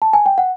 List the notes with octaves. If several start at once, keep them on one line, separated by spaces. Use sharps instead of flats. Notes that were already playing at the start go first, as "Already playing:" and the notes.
A5
G#5
G5
F#5